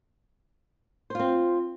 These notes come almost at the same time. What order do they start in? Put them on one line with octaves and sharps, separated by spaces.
C5 F4 C4